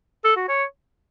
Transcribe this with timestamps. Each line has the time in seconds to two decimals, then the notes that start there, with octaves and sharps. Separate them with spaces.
0.24 A4
0.36 F#4
0.48 C#5